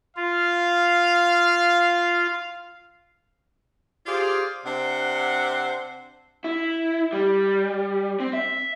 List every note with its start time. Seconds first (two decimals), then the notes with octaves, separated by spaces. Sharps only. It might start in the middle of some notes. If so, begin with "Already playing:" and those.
0.17 F4 F5
4.06 F4 G4 G#4 C5 D5 F5
4.66 C3 D4 C5 F#5
6.44 E4
7.13 G3
8.20 C4
8.33 E5